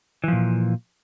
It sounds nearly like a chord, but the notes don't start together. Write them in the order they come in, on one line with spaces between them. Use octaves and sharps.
E3 F3 A#2